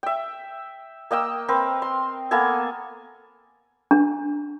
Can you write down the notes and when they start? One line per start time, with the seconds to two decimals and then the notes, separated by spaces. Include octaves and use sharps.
0.03 E5 G5
1.11 A#3 D#5 G5 E6
1.48 C4 A#4 B4
1.82 C6
2.31 A#3 B3 A4 G#5
3.91 D4